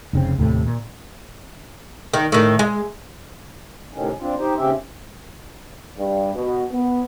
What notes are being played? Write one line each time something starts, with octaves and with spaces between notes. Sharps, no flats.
F1 C#3 C4
D#2 A2 C3 A3
A#2
D#3
A2 D#3
G#3
A2 C3 D#3 C#4
C4 D4 F4
D#4 G4 C5
D#2 C#3 C4 C#4 G4 E5
G2
B2
B3